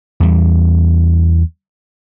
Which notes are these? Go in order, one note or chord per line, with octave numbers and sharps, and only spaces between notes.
E2 G3